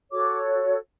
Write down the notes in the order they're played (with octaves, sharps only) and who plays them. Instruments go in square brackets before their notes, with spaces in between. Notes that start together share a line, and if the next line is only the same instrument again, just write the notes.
[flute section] F#4 A4 C#5 D6